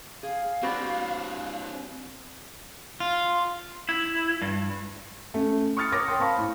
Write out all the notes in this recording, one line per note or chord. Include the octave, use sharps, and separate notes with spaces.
G#4 F5
B3 C4 D4 F#4 G4
F4
E4
G2
A3 C#4 A4
C#6 D#6 F6 A6 C#7
A#4 C#5 D6 D#6 A#6
G5 C6 D#6
C5 F5 A5 B5 C#6
A2